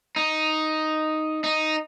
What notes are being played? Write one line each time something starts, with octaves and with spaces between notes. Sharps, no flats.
D#4
D#4